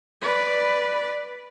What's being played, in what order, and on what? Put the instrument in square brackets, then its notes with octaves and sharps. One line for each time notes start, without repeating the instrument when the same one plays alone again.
[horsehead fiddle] B4 D5